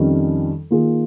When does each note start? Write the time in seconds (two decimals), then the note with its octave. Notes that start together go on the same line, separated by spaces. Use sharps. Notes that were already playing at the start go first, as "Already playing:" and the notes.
Already playing: F2 D#3 G3 C#4
0.71 D#3 A#3 F4 G#4